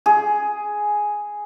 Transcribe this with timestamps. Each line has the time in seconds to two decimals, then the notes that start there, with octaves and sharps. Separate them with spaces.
0.06 G#4